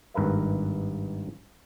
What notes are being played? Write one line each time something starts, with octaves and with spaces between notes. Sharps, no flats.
G#1 G2 A#4 B4 E5